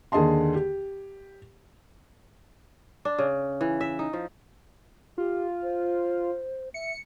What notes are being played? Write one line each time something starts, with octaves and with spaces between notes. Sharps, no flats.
D#2 D3 G#4 D#5 A5 C6
G4
D4
C#3
E3
E5
D#4
F3
F4 G4
C5
E5 C#7